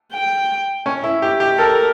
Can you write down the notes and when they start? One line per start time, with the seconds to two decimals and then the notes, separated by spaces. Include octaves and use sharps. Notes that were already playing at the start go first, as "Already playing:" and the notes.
0.13 G5
0.86 C#4
1.04 E4
1.22 G4
1.40 G4
1.58 A4 A#4